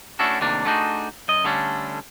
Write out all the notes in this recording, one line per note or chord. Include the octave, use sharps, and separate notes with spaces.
A3 C#4 D4 E4 F#4 A4
D#2 A2 C3 A#3 D4
A3 B3 D4 D#4 F#4 G#4
F#2 D#5
D3 G3 A3 C#4 D4